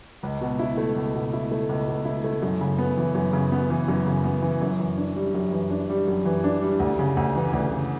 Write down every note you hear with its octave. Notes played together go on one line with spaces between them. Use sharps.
C#2
B2
E4
A3
C#2
B2
E4
A3
C#2
B2
E4
A3
F#2
C#3
B3
E3
F#2
C#3
B3
E3
F#2
C#3
B3
E3
F#2
E3
D4
G3
F#2
E3
D4
G3
F#2
E3
D4
G3
D2
C#3
D2
E3
D2
C#3